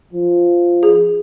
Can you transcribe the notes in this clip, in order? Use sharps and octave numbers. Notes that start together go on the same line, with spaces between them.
F3
G#4